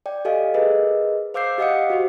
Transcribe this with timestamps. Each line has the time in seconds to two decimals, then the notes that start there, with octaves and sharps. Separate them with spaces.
0.06 D5 G5
0.25 G4 A4 D#5 F5 G#5
0.54 G#4 A#4 B4 D#5
1.34 C5 F5 D6 E6 G6 C7
1.58 G4 D#5 F5 F#5 D#6 C#7
1.90 F#4 G4 C5